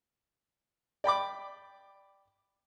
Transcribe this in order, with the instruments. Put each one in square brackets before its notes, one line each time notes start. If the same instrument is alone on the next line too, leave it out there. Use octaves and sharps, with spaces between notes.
[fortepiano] D5 G5 B5 D6